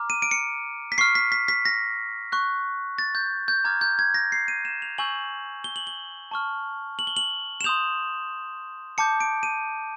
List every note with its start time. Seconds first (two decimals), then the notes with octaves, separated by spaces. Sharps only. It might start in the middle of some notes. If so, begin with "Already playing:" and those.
Already playing: A#5 D6 F6
0.10 D#7
0.22 D7
0.31 C#7
0.92 B6
0.98 C#6 F6 C7
1.15 B6
1.32 B6
1.48 B6
1.65 A#6
2.32 C#6 F#6
2.99 A6
3.15 G6
3.48 G6
3.64 A#5 D6 F6 G#6
3.81 G6
3.99 G#6
4.14 A#6
4.32 C7
4.48 D#7
4.65 E7
4.82 F7
4.98 G#5 C#6 E6 G6 F#7
5.64 G7
5.76 F#7
5.87 G7
6.31 A5 C#6 F6
6.99 F#7
7.07 G7
7.17 F#7
7.61 E7
7.64 C6 D#6 G6 F7
8.98 A5 D6 G6 C#7
9.21 D7
9.43 D#7